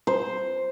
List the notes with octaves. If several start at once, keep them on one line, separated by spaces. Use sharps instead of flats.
C5